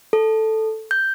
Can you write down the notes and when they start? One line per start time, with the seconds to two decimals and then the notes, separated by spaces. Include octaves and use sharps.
0.13 A4
0.91 G6